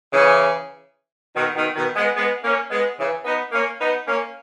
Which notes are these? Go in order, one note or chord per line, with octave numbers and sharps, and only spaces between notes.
C#3 E3
B2 D#3
B2 D#3
B2 D#3
G#3 B3
G#3 B3
A#3 C#4
G#3 B3
C#3 E3
B3 D#4
A#3 C#4
B3 D#4
A#3 C#4